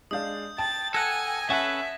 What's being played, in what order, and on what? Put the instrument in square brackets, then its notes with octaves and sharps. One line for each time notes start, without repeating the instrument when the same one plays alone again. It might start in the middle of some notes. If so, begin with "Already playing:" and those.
[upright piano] G#3 D4 F5 [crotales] D#6 G6
[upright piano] G5 A5 [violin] A6
[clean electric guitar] A4 F#5 [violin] G#5 [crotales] G#6 A#6
[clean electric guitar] C#4 A4 B4 [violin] E5 [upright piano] F#5